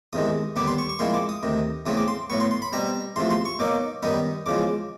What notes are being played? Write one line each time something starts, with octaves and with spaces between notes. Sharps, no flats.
E2 C3 D#3 G#3 D#6
D#2 D3 G3 B3 D4 D6
C6
C#6
C#6
A#2 F3 G#3 C4 E4 C6
D6
D#6
D2 C3 D#3
E2 C#3 F#3 A3 C4 D#6
D6
C6
A2 F#3 B3 C#6
C6
C6
B5
B2 G3 C4 A#5
E2 C3 F3 A3 C6
C6
C#6
B2 F#3 A#3 D#4 D6
F#2 D#3 G3 B3 D#4 D#6
E2 C#3 F3 G#3 D6